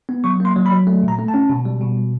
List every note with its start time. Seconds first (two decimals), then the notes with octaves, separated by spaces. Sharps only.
0.09 B3
0.24 F#3 C#6
0.40 A#3 C6
0.56 F#3
0.66 B5
0.71 F#3
0.87 A3
1.03 A#2
1.08 A#5
1.19 A3
1.28 A5
1.34 C#4
1.49 B2
1.65 G3
1.81 B2